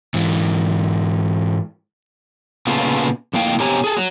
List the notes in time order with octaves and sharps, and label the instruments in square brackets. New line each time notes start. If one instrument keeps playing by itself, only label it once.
[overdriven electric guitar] G#2 E3
[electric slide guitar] A#2 C#3 A3 B3 F4
F2 A2 A#3 F5 G5
B2 C4 G4 C#5 G#5 A#5
G#4 A4
F#3